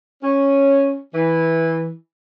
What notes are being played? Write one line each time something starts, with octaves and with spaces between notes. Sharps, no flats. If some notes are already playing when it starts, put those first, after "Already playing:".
C#4
E3